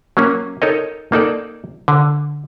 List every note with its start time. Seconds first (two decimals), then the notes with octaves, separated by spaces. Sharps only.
0.17 F#3 A#3 C#4
0.62 D#4 A4 A#4 C#5 D#5
1.12 A#3 D#4 A4 D5
1.88 D3